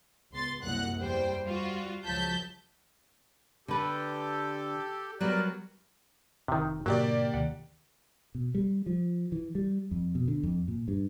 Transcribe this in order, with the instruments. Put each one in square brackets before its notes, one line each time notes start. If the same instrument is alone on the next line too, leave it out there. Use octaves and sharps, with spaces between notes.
[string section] C#2 B3 C6 A6
C2 F#2 A#2 F#5 F#6
E2 G3 C5 G5
G3 F4 F#4
C#2 F3 F#3 A5 G6 B6
[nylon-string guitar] D3 B4 [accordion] G4 A4
[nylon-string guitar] F#3 G3 B3 [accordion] A#4 D5 F#6
[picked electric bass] F1 [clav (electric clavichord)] C3 D#3
[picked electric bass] G#2 B2 D3 [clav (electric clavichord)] F#3 [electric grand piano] A#3 G4 D5
[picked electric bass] D2 C3 D#3 [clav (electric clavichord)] F#5
[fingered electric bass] B2
G3
F3
E3
G3
F2
B2
D3
F2
A#2
G2